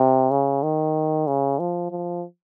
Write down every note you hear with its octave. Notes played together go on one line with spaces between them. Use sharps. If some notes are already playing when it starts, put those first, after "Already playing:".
Already playing: C3
C#3
D#3
C#3
F3
F3